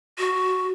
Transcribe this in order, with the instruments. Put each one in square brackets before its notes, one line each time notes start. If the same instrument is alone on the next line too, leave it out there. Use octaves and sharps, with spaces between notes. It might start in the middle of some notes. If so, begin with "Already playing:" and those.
[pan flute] F#4